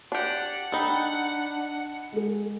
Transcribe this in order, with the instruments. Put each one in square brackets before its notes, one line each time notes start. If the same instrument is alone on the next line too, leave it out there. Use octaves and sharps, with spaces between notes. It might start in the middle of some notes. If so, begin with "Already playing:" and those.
[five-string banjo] D4 G4 [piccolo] F#5
[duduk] D4 [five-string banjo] D#4 A4 [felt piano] G5 B5
[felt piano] G#3 G#4